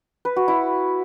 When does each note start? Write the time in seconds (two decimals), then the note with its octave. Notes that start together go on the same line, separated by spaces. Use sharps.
0.25 B4
0.36 F#4
0.48 E4